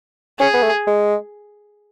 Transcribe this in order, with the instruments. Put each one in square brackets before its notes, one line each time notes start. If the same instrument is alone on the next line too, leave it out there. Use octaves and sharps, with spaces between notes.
[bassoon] C#4 [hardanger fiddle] G#4
[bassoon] B3
A3
G#3